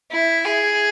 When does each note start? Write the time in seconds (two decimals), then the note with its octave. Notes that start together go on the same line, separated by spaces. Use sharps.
0.12 E4
0.45 G#4